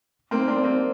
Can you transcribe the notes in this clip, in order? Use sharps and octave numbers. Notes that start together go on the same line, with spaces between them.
A#3 C4
C4 D4
A#3 C4